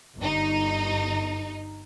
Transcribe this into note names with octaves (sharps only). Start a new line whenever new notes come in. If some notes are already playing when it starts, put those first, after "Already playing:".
G1 D#4